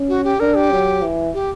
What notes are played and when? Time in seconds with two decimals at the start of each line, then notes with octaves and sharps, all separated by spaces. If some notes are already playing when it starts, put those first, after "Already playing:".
Already playing: C#4
0.09 F#4
0.24 G4
0.40 D4 A#4
0.56 G4
0.71 F#3
1.02 E3
1.34 G4